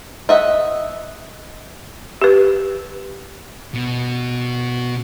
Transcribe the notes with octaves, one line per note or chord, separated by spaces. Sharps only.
D#5 E5 F#5
G4 B4
B2